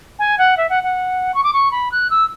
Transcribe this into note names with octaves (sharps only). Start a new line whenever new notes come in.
G#5
F#5
E5
F#5
F#5
C#6
D6
C#6
B5
F#6
E6